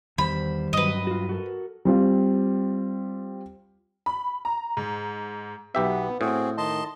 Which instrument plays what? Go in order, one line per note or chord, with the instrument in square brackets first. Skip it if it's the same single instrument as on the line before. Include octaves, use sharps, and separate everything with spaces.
[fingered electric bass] E2 [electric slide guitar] D#3 G3 C5 [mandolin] B5
[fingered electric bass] G2 F#3 [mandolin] B4 D#5
[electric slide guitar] F4 F#4
F#4 A4 A#4
[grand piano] G3 C4 F4
[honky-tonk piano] B5
A#5
G#2
[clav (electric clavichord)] B1 G4 E5 [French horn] B3
[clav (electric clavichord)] A2 [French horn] C4 [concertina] F#4 G#4
[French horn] D#3 [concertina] D#5 A5 C6